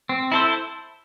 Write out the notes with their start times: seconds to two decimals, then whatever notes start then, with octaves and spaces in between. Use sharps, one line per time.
0.09 C4
0.32 E4 A4 C5